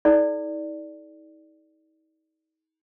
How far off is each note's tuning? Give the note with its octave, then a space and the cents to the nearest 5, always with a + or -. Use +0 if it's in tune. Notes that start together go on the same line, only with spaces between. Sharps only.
D#4 +40 A4 -45 D5 +0